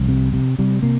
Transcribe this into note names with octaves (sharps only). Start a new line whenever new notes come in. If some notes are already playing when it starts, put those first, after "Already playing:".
Already playing: C2 F3
C3
C3
C3 G3
C3 A#3